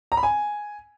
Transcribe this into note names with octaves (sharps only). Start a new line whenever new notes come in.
A#5
B5
G#5